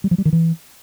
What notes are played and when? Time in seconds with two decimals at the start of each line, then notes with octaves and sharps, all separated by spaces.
0.04 G3
0.11 F3
0.18 G3
0.25 D#3
0.33 E3